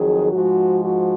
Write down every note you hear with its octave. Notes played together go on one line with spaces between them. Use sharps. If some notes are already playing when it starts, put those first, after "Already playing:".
Already playing: F2 D#3 F#3 G#4
G#2 F3 G#3 F#4
F#4